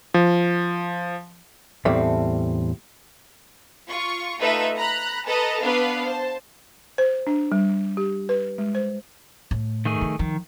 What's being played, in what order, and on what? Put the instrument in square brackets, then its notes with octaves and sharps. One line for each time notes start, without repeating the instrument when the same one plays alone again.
[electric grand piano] F3
[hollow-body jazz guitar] E2 A2 G3 A3 C4
[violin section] F4 C#6
A3 D#4 F4 A4 B4 E5
A#5 B5 F#6
A4 B4 D#5 A5 A#5
B3 D4 B4 F5
C5 A5
[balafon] C5
D4
G3
G4
B4
G#3
C5
[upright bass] A2
[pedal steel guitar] D#3 A3 G#4
[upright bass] F3
[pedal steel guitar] D#3 [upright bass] F3